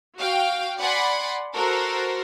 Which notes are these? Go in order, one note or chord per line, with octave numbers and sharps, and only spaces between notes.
F#4 F5 G5
D5 F#5 G#5 B5 C6
F#4 A4 A#4 C5